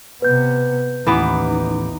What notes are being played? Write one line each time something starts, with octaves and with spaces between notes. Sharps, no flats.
C3 B3 B4 G6
A1 D#2 E3 B3 D#4 D6